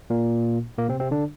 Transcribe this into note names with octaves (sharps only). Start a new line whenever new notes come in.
A#2 A#3
A#2 A#3
C3 C4
C3 C4
D3 D4